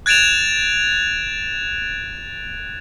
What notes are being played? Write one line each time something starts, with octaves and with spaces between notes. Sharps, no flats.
F#6 G#6 A6 D7 E7 F7